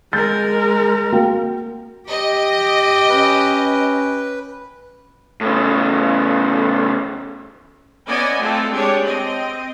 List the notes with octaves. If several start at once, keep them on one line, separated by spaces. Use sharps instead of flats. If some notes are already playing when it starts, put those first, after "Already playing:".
G#3 A#4 G6 A6
A#3 F#4 G5
G4 D#5
C#4 B4
A2 C#3
B3 C#4 D5 D#5 G#5
A3 C4 F4 A4
G#3 D4 G4 G#4 C#5
C4 D#5